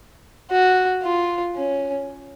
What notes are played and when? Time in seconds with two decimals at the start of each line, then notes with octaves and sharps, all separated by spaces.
0.51 F#4
1.03 F4
1.56 C#4